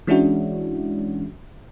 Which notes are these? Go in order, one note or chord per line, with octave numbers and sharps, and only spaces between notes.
E3 G#3 C#4 D4 E4 F#4